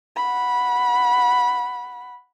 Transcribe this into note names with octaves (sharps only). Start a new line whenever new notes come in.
F#5 B5